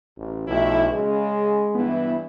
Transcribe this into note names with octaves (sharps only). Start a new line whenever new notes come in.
A1
B1 F3 A3 E4
C#3 G#3
G2 E3 B3 E4